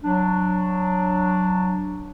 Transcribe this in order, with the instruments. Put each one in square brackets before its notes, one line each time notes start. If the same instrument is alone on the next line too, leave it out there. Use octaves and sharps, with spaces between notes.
[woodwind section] F#3 D4